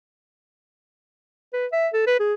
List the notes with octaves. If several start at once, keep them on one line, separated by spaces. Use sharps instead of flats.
B4
E5
A4
B4
G#4